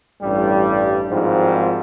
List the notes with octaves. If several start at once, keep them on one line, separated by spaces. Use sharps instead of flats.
A1 G2 G3
G#1 G#2 F3 G3 C4 F4